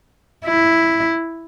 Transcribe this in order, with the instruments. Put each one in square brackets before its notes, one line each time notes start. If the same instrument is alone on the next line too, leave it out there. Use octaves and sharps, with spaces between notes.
[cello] E4